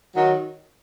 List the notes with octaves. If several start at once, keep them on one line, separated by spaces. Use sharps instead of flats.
D#3 F#3